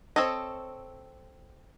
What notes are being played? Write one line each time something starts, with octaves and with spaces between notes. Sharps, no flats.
C4 A4 C#5 D#5